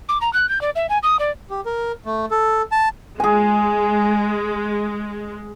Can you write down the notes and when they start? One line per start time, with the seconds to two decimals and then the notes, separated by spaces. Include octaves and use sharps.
0.09 D6
0.21 A#5
0.33 F#6
0.49 G6
0.61 D5
0.76 E5
0.89 G#5
1.03 D#6
1.19 D5
1.50 G4
1.66 A#4
2.06 A3
2.31 A4
2.72 A5
3.20 G#3 G#4 G#5